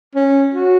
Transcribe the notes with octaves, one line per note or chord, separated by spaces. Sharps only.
C#4
F#4